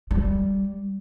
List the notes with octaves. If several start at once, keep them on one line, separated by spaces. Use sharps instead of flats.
G3